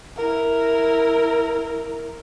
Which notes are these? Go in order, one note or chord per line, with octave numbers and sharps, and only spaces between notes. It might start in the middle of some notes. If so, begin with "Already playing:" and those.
E4 A#4